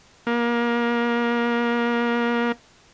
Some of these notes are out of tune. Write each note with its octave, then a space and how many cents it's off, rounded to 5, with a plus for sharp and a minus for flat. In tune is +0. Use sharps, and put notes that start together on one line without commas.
A#3 +25